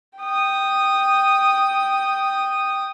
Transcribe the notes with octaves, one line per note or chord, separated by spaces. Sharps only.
G5 D#6